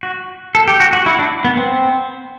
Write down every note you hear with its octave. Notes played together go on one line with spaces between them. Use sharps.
F#4
A4
G4
F#4
F#4
E4
D4
B3
C4